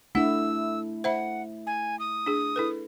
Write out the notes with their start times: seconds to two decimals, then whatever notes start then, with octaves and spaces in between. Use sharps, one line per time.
0.15 A3 D4 E4 F#5 E6
1.04 C5 E5 F#5 B5
1.67 G#5
2.00 D#6
2.26 D4 G#4
2.56 E4 A4 B4